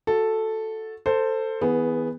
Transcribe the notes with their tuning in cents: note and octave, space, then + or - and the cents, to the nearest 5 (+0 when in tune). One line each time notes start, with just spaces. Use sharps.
F#4 -15 A4 +0
A4 +20 C5 +0
E3 -35 B3 +0 G#4 +0